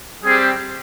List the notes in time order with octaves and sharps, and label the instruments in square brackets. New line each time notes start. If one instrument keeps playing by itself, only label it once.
[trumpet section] G3 C4 G4 G#4